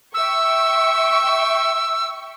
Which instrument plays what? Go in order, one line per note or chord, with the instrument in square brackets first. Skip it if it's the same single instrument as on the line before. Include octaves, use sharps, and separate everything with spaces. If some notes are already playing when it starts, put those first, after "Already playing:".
[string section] E5 G5 C#6 [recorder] E6